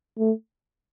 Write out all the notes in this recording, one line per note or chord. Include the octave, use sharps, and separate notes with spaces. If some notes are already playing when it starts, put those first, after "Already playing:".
A3